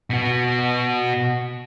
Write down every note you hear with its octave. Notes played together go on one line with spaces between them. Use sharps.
B2 F#4